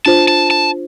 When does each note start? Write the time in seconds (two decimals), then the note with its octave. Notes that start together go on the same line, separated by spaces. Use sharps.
0.06 D4 F4 C5 A5
0.28 A5
0.51 A5